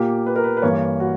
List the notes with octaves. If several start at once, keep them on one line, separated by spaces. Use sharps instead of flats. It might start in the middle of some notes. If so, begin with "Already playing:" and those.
Already playing: A#2 A#3 G4
B4
A#4
B4
B4
G2 E3 A#3 C#5
F#4